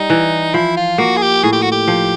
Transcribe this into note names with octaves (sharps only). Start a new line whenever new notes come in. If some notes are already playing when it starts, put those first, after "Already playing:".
Already playing: G3 D#4
E3
F3 E4
F4
A#3 F#4
G#4
G4
A2 G#4
G4
F#4
G4
F3